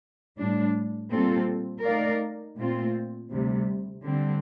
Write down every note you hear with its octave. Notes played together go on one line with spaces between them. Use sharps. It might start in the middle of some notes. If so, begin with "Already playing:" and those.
A2 G3 D4
A#2 G3 C4 F4 A4
A3 D#4 A#4 D5 F5
A#2 A3 C4 F4
D2 C3 G3
D3 G3 C4